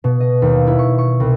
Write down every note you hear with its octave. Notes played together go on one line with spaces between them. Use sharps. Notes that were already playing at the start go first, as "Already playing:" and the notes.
B2
D#5
D#2
E4
C#6
C#6
C2